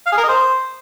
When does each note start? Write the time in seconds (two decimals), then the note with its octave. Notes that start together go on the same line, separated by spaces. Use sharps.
0.07 F5
0.12 G#4
0.18 A#4
0.23 D#5
0.29 C5